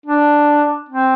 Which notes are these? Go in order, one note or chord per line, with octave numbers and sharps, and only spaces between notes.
D4
C4